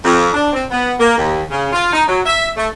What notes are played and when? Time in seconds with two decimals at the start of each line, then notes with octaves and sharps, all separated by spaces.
0.04 F2
0.33 D4
0.53 C4
0.71 B3
1.00 A#3
1.17 D#2
1.50 C#3
1.73 F4
1.93 D#4
2.08 F#3
2.26 E5
2.57 A3